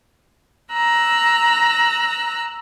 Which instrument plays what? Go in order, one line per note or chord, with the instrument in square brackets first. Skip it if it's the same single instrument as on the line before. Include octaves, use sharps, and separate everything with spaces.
[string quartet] A#5 E6 F#6